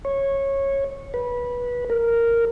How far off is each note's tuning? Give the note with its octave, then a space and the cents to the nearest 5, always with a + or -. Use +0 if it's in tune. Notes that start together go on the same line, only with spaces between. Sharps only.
C#5 -15
B4 -20
A#4 -5